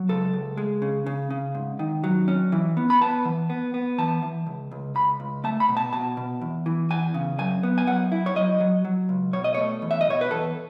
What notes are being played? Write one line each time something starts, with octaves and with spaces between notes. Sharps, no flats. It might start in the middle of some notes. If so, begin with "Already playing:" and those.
Already playing: F#3
C#2 A4
C#2
G#3
C#3
C#3
C#3
G#2
D#3
F#3
C#4
E3
B3
B5
B3 A5
E3
B3
B3
E3 A5
E3
C#2
C#2
C#2 B5
C#2
A3 A5
B5
B2
A5
B2 A5
B2
E2
E3
E2 G#5
C#3
F#2 G#5
B3
G#5
F#2 F#5
E4
C#5
F#3 D#5
F#3
F#3
C#2
B2 C#5
D#5
A3 C#5
E2
E5
D#5
B2 C#5
B4
E2 A4